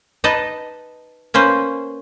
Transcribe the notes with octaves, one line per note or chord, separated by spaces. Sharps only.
D#4 B4 D#5 A5
A#3 C#4 B4 C5